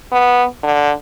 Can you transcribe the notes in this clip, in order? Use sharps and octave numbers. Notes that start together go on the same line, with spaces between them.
B3
D3